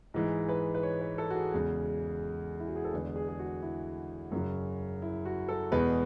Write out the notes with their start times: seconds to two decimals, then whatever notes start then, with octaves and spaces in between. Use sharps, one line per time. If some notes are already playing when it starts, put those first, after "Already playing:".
0.14 G#2 E3 G#3
0.49 B4
0.75 B4
0.83 C#5
1.01 B4
1.18 A4
1.30 F#4
1.36 G#4
1.53 E2 C#3 G#3
2.60 E4
2.68 F#4
2.76 G#4
2.85 A4
2.93 E2 D3 G#3 B4
3.16 G#4
3.29 G#4
3.39 F#4
3.62 E4
4.32 F#2 C#3 F#3
5.02 E4
5.25 F#4
5.48 A4
5.72 E2 B2 G#3 B4